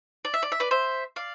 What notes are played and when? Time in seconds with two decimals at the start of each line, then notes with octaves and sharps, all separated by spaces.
0.25 D5
0.34 E5
0.43 D5
0.52 E5
0.60 B4 D5
0.71 C5 E5
1.16 D5 F5